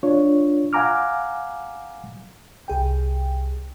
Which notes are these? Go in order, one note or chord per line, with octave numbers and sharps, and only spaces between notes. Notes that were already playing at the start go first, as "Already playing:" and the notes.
D4 F4 C#5
F5 F#5 G#5 A#5 D6 F6
C2 G#4 G5